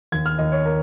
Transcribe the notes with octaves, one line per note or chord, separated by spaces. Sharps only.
D#2 G#6
F6
D#2 D#5
C#5
A#4